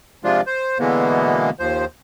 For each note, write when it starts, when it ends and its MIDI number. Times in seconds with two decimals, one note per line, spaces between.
0.24 0.41 48
0.24 0.41 53
0.24 0.41 56
0.24 0.41 62
0.24 0.41 65
0.47 0.78 72
0.79 1.50 47
0.79 1.50 50
0.79 1.50 52
0.79 1.50 56
0.79 1.50 58
0.79 1.50 59
1.59 1.85 39
1.59 1.85 53
1.59 1.85 72